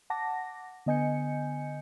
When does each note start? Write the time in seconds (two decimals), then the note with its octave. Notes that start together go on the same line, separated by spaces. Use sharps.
0.10 F#5 A5 D6 A#6
0.86 D3 B3 D#5 G#5 G6 C#7